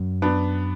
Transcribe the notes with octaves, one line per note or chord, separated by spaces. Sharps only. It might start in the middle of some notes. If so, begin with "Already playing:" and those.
Already playing: F#2
B3 D4